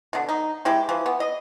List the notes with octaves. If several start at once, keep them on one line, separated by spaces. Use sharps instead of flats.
B2 D3
D#4
G#3 E4 G4
E3 F3
B3
D#5